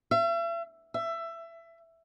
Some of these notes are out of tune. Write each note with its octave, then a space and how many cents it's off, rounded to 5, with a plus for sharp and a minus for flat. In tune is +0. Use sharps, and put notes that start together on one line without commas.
E5 +40
E5 +20